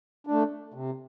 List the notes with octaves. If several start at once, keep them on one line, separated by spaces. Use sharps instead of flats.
A3 D4
C3